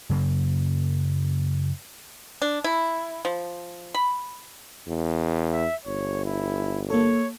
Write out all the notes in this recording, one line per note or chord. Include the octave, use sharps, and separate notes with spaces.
F#2 C#3 A#3
D4
E4
F3
B5
E2
E5
G1 C#5
E4
A#3 A4 C#5